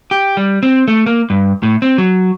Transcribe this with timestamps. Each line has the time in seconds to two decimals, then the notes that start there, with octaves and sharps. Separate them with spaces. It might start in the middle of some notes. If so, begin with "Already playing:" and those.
0.11 G4
0.37 G3
0.63 C4
0.88 A3
1.06 A#3
1.30 G2
1.63 A2
1.82 C4
1.98 F#3